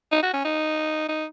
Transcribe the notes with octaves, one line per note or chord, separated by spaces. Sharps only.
D#4
F#4
C#4
D#4
D#4